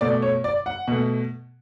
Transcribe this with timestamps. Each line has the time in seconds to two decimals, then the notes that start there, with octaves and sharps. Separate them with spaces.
0.01 B2 A3 D5
0.22 C#5
0.44 D5
0.66 F#5
0.88 B2 A3